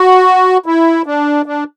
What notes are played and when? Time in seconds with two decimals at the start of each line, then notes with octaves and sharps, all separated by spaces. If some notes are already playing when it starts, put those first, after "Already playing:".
Already playing: F#4
0.66 E4
1.06 D4
1.46 D4